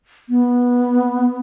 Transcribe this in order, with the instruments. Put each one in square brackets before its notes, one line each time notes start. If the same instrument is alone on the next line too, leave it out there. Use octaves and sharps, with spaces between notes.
[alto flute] B3